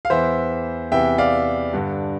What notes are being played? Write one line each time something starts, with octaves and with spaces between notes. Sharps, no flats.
F5
E2 E3 C5 E5
E2 C3 E3 E5 G5
D5 F5
G2 D3